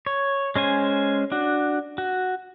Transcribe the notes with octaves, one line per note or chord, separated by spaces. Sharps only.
C#5
G#3 C#4 C5 G#5
D4 F#4
F#4